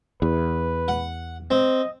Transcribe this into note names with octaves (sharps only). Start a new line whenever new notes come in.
E2 B4
F#5
C4 D#5